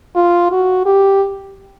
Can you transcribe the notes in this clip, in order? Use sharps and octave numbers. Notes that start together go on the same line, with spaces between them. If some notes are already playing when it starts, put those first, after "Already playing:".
F4
F#4
G4